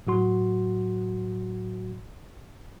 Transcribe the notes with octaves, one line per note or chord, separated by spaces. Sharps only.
A2 F#3 F#4 C6